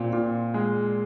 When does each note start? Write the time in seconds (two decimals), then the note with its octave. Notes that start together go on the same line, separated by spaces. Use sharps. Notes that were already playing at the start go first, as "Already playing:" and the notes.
Already playing: A#2 C4
0.13 A#2
0.54 G#3